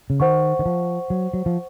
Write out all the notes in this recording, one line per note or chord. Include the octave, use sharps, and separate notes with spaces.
C#3
D#3 C5 F#5 C#6
D#3
F3
F#3
F#3
F3